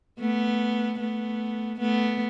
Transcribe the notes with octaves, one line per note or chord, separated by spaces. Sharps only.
A3 B3
A3 B3
A3 B3